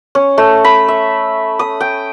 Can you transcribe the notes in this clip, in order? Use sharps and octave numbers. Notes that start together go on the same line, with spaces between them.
C#4
A3
B5
E5
D#6
G5